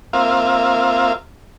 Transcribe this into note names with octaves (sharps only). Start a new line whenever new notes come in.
A#3 C4 F4 E5 F5